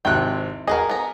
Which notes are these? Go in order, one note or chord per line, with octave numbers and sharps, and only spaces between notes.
G#1 C3 E4 G5 F#6
F#4 G#4 A#4 B4 D#5
B3 A#5